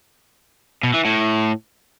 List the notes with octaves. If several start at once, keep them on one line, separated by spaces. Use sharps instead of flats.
B2
E3
A2